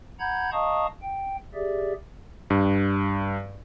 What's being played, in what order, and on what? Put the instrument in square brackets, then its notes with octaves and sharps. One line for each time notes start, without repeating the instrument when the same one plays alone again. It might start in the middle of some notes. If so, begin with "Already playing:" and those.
[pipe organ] F#5 A#5 B5 G6 G#6
D#5 F5 A5 A#5 C#6 D#6
G5
G4 G#4 D5 E5
[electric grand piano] G2